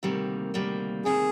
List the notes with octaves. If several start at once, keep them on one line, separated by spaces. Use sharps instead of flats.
D2 C3 D#3 G3 A#3
D2 C3 D#3 G3 A#3
D2 C3 D#3 G3 A#3 G#4